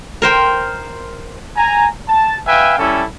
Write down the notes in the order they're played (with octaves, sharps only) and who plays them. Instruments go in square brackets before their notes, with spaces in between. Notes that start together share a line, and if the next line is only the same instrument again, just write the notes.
[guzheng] A#4 C5 G5
[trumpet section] G#5 A#5
A5
B4 E5 F5 G5 G#5
G3 C#4 E4 A4